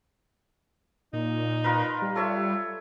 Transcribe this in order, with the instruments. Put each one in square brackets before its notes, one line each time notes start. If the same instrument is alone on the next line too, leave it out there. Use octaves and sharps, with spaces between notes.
[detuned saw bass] A#2 [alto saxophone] D#4
[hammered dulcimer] F4 A#4 B4
[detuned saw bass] G3
[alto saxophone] F4 [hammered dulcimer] A4 C#5 E5